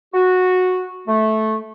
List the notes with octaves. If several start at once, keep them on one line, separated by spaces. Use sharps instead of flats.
F#4
A3